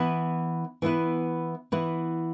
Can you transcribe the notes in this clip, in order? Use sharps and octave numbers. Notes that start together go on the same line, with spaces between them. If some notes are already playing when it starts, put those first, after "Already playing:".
Already playing: E3 B3 E4 B4
E3 B3 E4 B4
E3 B3 E4 B4